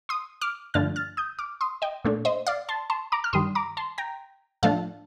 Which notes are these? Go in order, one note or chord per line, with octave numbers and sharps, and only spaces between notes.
C6 D#6
D6 F6
G2 D3 F3 A3 D4 F6 A6
F6 A6
D#6 G6
D6 F6
C6 D#6
D#5 G5
A#2 A3 D4
C5 D#5
D5 F5
A5 C6
A5 C6
A#5 D6
F6
G2 D#3 G3 C6 D#6
A#5 D6
A5 C6
G5 A#5
A2 F3 A3 D4 F5 A5